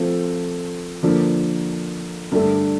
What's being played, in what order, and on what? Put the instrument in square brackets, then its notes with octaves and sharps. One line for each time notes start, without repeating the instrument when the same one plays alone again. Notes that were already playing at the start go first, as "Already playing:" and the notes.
Already playing: [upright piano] F3 A3 C4 F4 A4
D3 F3 A#3
G2 D3 A3